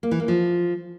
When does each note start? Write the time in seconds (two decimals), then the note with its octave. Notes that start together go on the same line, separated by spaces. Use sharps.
0.03 A#3
0.11 E3
0.20 A#3
0.28 F3